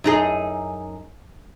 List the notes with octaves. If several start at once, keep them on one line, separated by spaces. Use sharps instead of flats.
F#2 D#4 G#4